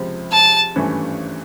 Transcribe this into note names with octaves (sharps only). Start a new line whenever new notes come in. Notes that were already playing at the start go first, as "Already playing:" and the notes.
Already playing: C#2 C3 F3
A5
G#1 G2 E3 A3 C#4